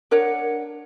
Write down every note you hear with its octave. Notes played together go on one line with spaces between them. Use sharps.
D4 A#4 C#5 F#5